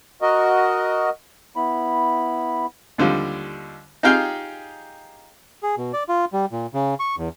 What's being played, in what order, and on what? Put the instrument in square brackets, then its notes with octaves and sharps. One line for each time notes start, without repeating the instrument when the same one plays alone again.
[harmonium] F#4 A#4 D#5
[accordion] B3 E4 B5
[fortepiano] D#2 D3 F3 G3
D#4 F4 G4 G#4 F5 G5
[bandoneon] G#4
B2
D5
F4
G3
A#2
C#3
C#6
E2